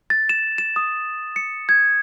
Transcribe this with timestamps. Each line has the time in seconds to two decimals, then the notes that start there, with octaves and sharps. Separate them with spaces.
0.10 A6
0.29 E7
0.58 E7
0.76 D#6
1.36 C#7
1.69 G#6